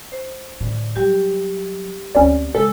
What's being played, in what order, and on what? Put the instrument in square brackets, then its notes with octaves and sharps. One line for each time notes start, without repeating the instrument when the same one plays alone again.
[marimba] C5
[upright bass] A2 D3
[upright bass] F#3 [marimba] G3 G4
[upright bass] D2 C4 [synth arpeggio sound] C#4 C#5 D5
[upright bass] C#3 [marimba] G#3 [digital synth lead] A4